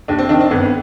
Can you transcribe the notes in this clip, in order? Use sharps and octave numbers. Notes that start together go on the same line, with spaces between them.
D#2 D4
C4
D#3 D4
C4
G1 B3